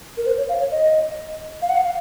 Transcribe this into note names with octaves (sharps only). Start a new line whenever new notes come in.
A#4
C5
C#5
F5
C#5
D#5
F5
F#5
F5